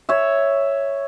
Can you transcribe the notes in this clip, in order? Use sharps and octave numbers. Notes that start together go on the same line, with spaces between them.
C#5 E5